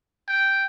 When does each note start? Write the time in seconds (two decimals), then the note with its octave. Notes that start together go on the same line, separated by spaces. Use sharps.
0.28 G5